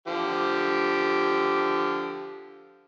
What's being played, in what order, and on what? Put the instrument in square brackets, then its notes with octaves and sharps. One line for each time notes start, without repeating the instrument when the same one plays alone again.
[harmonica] D3 F3 G4